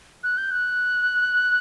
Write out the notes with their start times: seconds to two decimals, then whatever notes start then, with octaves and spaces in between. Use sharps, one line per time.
0.24 F#6
0.38 G6
0.51 F#6